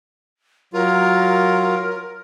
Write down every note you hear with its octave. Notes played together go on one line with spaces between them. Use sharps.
F#3 F4 A#4